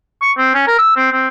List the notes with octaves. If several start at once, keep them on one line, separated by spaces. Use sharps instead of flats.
C#6
C4
C#4
A#4
E6
C4
C4